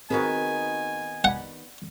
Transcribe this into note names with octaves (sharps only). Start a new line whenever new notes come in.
D#3 B3 C4 F#4 G#4 A#4 G#5
D5 F#5 B5